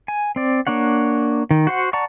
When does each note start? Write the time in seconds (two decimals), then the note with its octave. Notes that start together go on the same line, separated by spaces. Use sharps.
0.08 G#5
0.36 C4 D5
0.67 A#3 D4 C#5 F#5
1.51 D#3
1.67 F#4 C5 F#5
1.93 D5 F#5 A5 A#5 C#6